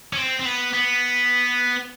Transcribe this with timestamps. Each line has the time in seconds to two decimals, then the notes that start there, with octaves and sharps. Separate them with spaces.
0.13 C#4
0.17 C4
0.40 C4
0.45 B3
0.73 B3